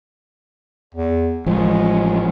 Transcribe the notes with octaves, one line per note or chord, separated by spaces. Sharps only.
E2
A1 F3 G#3